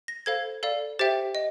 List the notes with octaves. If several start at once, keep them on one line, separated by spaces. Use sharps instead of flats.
A#6
A4 C5 F5 G#6
A4 D5 F5
G4 C5 E5 G5 A6
D#5